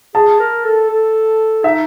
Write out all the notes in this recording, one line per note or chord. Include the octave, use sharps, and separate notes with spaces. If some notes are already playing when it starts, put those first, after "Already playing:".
G#4 A5
A#4
A4
A4
D#4 E5